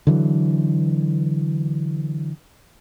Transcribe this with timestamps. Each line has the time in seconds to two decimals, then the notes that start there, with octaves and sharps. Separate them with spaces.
0.07 D3 E3 F#3